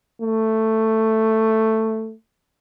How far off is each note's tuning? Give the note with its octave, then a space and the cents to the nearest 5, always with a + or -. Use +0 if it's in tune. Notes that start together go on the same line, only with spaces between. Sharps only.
A3 +10